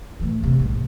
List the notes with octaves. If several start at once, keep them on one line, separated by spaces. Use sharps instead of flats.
A2 E3
F2 C3
A#1 G#2
C3